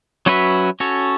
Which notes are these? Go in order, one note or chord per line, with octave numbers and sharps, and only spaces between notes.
F#3 C#4 F#4 B4 E5
C#4 F#4 A4 C#5